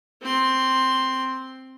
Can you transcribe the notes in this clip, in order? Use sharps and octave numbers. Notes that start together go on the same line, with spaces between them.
C4 C6